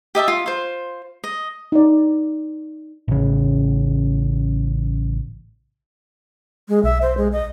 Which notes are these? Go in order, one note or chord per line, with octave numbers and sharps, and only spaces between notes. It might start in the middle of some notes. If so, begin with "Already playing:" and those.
G4 D#5 E5 A5
F4
F4 C5
D#5
D#4 D5
A1 C#3
G#3
B1 E5
C5
G#3
D#5